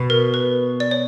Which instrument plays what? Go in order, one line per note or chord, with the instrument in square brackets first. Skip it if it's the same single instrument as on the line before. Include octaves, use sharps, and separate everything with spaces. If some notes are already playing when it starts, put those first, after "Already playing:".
Already playing: [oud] B2
[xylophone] A#4
B4
D5
C#5